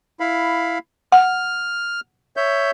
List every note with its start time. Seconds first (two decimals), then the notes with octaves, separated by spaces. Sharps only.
0.20 E4 F5 B5
1.12 F#5 F6
2.37 C#5 E5 G6